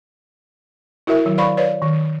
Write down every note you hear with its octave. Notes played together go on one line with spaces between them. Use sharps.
E4 F#4 A#4 E5
D#3 F#3
B4 C5 D5 F5 B5 C#6
B4 C#5 D5 F5
D#3